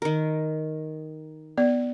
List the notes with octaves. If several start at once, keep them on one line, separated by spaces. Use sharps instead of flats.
D#3 A#4
B3 D5